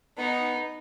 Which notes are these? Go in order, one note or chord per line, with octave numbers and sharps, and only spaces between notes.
B3 D#4